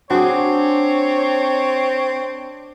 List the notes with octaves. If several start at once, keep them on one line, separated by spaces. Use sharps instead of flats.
C4 D4 F#4 G#4 C#5